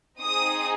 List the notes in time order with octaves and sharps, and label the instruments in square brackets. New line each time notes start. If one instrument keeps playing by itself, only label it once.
[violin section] C4 D#4 G#4 D#6